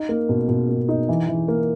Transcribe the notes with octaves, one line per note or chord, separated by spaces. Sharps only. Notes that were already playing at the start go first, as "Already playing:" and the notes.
Already playing: D#4
A#3
B2
B2
A#3
D#4
E3
E3
A#3